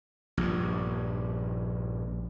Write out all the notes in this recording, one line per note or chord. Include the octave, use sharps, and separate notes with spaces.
A#1 G2